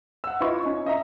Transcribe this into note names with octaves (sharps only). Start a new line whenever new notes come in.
F#5 E6
E4 F4 B4 D#5 C#6
C#4 D#4
D#5 E5 A#5